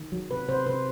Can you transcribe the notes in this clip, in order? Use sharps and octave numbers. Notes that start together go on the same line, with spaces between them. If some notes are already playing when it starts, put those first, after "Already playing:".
Already playing: D#3
F#3
C3 B4
C3 C5
C3 B4